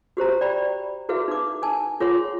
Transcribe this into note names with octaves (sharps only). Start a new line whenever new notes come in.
F#4 G4 C5 A#5
D5 G5 A#5 B5
E4 F#4 G#4 B4 E5 F5
D#4 D6
D#4 G#5 A5
F4 G#4 C#5 F#5 C6